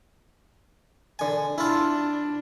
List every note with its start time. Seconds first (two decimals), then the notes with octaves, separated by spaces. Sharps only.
1.19 D3 G#5
1.58 D4 E4 F4